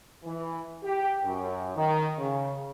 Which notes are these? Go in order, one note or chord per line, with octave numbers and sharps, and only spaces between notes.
E3
G4
F#2
D#3
C#3